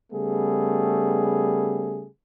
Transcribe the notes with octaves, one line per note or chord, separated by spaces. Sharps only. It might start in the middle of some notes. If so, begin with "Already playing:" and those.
C#3 G3 A3 B3 G#4